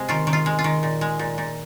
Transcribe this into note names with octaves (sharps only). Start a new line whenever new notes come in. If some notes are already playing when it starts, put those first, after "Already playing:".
Already playing: C3 G#3
D#3 F4
D#3
F4
G#3
F4
D#3
A#2
G#3
A#2
A#2